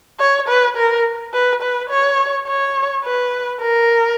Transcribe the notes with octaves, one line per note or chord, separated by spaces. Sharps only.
C#5
B4
A#4
B4
B4
C#5
C#5
B4
A#4